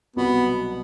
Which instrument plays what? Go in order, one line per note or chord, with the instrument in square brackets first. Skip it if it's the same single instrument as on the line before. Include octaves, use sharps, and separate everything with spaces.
[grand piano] C2 B2 F#3 [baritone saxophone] B3